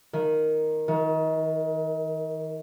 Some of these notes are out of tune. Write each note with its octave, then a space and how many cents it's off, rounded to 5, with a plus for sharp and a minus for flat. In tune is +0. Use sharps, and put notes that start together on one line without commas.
D#3 +0
D#3 +35